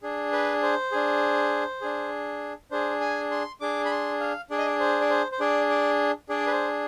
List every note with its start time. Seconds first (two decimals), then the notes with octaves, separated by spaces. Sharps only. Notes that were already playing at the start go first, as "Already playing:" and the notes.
0.02 D4 G#4
0.33 B4
0.62 C5
0.92 D4 G#4
1.81 D4 G#4
2.71 D4 G#4 C5
3.01 G#5
3.31 C6
3.61 D4 G#4 D6
3.85 B5
3.91 C6
4.20 F5
4.50 D4 G#4 D5
4.58 D#5
4.66 D5
4.80 C5
5.01 D5
5.10 C5
5.32 C5
5.40 D4 G#4 D5
5.70 D5
6.29 D4 G#4 D5
6.47 B4
6.52 C5